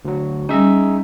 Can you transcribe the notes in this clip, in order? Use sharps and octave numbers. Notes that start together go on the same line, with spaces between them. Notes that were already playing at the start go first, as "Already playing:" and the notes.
D2 F#3
G3 C#4 D#4 G#4 E5